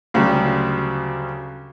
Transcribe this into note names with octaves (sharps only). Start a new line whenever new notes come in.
D2 C#3 F#3 G3